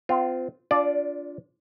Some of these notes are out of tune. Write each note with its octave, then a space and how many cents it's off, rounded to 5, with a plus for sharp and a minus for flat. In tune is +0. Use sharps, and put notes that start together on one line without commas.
C4 -30 F4 +0
D4 -30 F4 +0 D5 +0